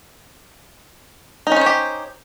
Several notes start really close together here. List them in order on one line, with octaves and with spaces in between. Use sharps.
D#4 C#4 C5 C#5 G4